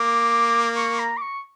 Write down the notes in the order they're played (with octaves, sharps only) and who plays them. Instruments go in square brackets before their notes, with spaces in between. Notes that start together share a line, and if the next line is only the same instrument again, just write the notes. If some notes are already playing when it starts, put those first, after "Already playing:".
Already playing: [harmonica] A#3 [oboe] D6
[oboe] C#6
A#5
D6
C#6